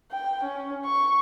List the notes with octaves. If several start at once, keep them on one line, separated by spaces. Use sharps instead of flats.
G5
C#4
C#6